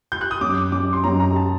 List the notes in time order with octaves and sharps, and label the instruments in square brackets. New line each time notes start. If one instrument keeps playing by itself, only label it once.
[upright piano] G6
F#6
D#6
[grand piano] F#2 [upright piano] D6
[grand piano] F#2 [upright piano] D6
[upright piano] C6
[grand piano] F#2 [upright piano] A#5
[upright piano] A#5
A5